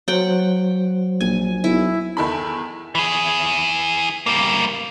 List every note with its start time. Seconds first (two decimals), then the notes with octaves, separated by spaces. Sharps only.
0.08 F#3 C5 F#5 G5
1.21 A#1 G#5
1.64 B1 E4
2.17 E2 D#3 E4 A4 B5
2.95 E3 G#4
4.26 G3 A#3